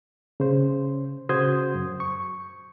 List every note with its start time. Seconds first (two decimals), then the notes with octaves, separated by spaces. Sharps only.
0.40 C#3 C5
1.29 C#3 F#4 C5 D#6 G6 G#6
1.75 F#2
2.00 C#6